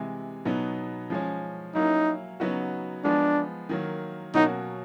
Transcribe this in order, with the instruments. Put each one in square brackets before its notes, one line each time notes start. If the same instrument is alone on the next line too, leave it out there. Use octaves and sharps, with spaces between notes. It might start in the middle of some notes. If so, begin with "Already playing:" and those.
Already playing: [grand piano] C3 E3 G#3
B2 F#3 B3 D#4
F3 G#3 C#4
[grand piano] F#3 A#3 C#4 E4 [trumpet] D#4
[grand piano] C#3 F#3 B3 D#4 F#4
[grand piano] F3 G#3 B3 [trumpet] D4
[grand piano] D#3 F#3 A#3
[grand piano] B2 F#3 A#3 C#4 F#4 [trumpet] D#4